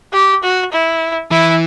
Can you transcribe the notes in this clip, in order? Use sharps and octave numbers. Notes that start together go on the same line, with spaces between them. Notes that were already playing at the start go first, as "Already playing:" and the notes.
G4
F#4
E4
E3 E4